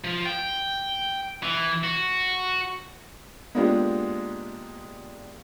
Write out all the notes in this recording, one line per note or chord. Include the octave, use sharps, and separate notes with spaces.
F3
G5
E3
F#4
G#3 A#3 B3 D4 F4 G4